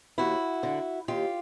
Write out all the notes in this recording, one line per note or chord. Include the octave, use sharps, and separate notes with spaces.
D#2 E4 F#4
D3
D#2 F4 G4